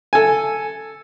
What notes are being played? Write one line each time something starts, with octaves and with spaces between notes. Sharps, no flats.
A4 G#5